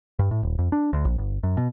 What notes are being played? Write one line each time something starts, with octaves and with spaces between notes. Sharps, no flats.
G2
A2
D#1
F2
D4
D2
A#1
G1
F#2
B2